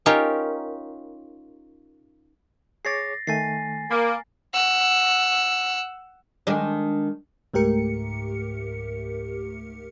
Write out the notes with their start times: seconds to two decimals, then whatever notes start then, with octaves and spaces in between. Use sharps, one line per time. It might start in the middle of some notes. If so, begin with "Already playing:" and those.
0.06 C#4 D#4 F4 G4 A#4 C#5
2.85 G#4 C#5 D6 A6 A#6 C7
3.27 D#3 A3 G#5 A6 C7
3.91 A#3 B5
4.54 F#5 E6
6.47 D#3 G#3 D4
7.54 C#2 G#2 A3 G4 A#4 C#7